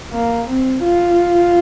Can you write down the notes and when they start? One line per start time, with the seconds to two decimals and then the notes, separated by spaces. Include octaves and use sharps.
0.12 A#3
0.48 C4
0.84 F4